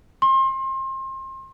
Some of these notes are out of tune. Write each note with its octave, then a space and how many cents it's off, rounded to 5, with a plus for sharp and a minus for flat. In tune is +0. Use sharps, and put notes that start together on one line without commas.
C6 +30